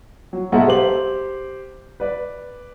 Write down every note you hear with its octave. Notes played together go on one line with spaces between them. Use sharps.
F#3
B1 G#3 A4 E5 F#5 A#5
G4 C5 F#7
B4 D5